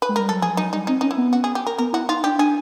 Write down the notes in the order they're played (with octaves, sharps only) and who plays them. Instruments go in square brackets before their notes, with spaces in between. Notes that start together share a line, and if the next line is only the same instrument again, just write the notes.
[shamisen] B4
[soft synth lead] G#3
[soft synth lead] G3 [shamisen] A#4
[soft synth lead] F#3 [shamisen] A4
[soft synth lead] F3 [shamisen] G#4
[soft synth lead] F#3 [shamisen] D#4
[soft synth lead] G3 [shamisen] D#4
[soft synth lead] C4 [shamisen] D#4
[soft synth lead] C#4 [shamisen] D#4
[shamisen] E4
[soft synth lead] B3
[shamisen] F#4
G#4
G4
A#4
[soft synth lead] B3 [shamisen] A#4
[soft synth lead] E4 [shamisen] F#4
[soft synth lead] D#4 [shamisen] F4
[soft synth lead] D4 [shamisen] G4
[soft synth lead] D4 [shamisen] G#4